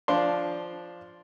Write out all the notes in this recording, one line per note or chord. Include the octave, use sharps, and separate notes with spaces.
F3 D4 F5 C6